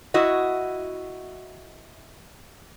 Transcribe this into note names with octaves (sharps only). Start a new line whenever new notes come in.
E4 F#4 D#5